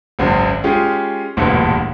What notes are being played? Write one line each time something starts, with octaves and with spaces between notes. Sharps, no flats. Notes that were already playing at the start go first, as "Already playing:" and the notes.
G#1 C#2 F#2
G#3 C#4 F4 G4 G#4
E1 A1 D2 G2 A#2 E3